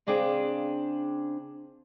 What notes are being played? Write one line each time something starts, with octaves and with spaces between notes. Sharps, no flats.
C#3 C4 D4 G#4 F5 G5